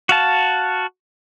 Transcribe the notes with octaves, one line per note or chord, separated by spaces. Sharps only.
F#4 F5 A5